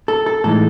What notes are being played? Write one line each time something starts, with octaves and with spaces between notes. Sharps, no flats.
A4
A4
A2 E3 G#3 D#4 A4